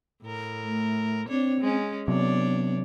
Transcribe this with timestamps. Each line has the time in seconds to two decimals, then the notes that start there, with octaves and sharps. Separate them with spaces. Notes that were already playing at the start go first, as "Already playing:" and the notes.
0.23 A2 A#4
0.64 A3
1.29 C4 D4 C#5
1.61 G#3 C#4
2.08 C3 F#3 B3 D4 C#5 D5